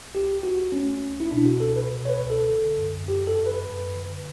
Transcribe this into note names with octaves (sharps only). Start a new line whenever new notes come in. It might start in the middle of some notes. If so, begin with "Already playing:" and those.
C#2 G4
C#2 F#4
A3 C#4
C#2
E4
B2 D4
F#4
C#2 A4
B4
B2
C#5
B4
C#2
A4
D3
F#2
F#2 G4
A4
F#2
B4
F#2
D3